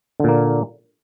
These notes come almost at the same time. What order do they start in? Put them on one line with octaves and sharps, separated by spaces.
D3 A#2 A#3